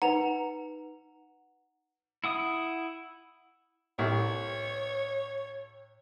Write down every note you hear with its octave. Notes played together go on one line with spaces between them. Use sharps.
D#4 B4 F#5 A#5 F7
E4 F#5 D#6
C2 A2 C#5